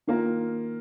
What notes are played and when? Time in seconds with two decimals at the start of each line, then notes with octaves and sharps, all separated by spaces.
0.07 D#3 A#3 F4 A#4